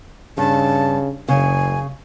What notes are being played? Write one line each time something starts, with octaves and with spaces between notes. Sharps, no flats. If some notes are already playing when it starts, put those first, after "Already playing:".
G2 C#3 A5
F#1 C#3 G#5